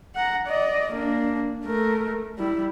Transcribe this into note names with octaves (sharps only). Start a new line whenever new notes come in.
F#5 A#5
D5 D#5
A#3 D4
A3 A#4
G3 E4